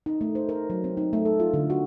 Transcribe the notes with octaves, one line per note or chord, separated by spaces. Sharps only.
D#4
A3
C5
A#4
F#3
C4
D#4
A3
A4
F4
D3
F#4